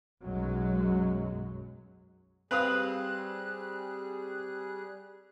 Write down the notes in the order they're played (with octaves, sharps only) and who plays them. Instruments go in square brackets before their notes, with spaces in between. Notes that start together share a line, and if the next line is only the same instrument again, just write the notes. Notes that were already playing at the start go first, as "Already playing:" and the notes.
[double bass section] B1 F#2 F#3 G#3
[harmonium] G3 G#4 [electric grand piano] C4 [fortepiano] B4 F5 D#6 [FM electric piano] F#6